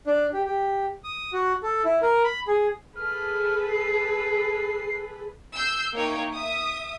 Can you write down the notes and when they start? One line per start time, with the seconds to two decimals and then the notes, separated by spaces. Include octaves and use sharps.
0.07 D4
0.33 G4
0.45 G4
1.04 D#6
1.33 F#4
1.63 A4
1.85 E4
2.02 A#4
2.24 B5
2.48 G#4
2.96 G#4 A4 B4 F6
3.69 C7
5.54 E6 G6 C7
5.95 A#3 D#4 E4 C#5 G5
6.34 E5 D#6